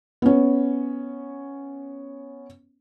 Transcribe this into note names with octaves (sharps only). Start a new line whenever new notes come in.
B3 C#4